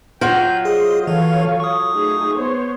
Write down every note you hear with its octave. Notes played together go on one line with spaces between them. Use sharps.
F#3 F4 E5 G5 G6
G#4 C5 D#5
E3 A4 C#5 F5
C#6 D#6
A3 D#4 G#4
B3 C5 C#5